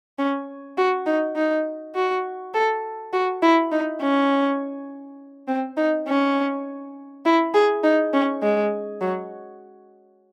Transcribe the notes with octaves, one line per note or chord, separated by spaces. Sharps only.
C#4
F#4
D#4
D#4
F#4
A4
F#4
E4
D#4
C#4
C4
D#4
C#4
E4
G#4
D#4
C#4
G#3
F#3